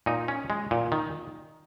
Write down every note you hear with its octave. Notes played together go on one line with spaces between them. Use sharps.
A#2 D#4
C#4
G#3
A#2
D#3